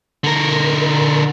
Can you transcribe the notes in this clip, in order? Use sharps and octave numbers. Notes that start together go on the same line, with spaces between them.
D3 A#4